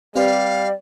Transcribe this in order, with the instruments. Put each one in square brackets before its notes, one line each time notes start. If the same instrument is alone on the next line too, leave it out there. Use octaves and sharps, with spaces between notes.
[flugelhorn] G3 [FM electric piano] C4 G4 B4 [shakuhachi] D5 [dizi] F5